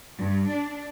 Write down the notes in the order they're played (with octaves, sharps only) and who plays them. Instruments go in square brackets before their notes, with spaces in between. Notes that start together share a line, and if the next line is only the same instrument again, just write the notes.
[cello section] G2
D4